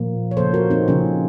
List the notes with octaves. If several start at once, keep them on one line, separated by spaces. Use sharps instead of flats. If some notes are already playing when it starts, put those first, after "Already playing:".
Already playing: A#2 F3 A#3
C#5
C#3 F3 A#3 A4 C5
F#4 A#4
C4 D#4
C#3 F3 A#3 C#4